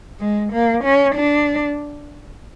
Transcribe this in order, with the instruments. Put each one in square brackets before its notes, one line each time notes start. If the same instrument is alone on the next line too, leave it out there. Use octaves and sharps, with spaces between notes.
[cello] G#3
A#3
C#4
D4